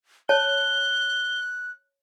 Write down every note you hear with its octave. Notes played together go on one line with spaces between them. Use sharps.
C#5 A5 F#6 G7